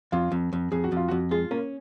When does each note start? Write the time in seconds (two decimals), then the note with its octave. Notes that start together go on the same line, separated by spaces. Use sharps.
0.12 F2 F4
0.32 F2
0.53 F2
0.72 F2 G#4
0.84 F#4
0.92 F2 F4
1.08 F#4
1.11 F2
1.31 G#3 F4 G#4
1.51 A#3 C#4 A#4